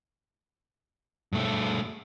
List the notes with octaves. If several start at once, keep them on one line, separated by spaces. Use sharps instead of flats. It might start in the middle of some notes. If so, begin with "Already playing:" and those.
G2 A3